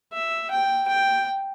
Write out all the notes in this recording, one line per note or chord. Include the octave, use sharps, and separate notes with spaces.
E5
G5
G5